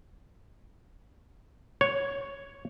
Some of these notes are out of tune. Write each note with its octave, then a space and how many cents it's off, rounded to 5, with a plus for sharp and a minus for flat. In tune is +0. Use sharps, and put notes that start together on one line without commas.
C#5 +0 F#5 +0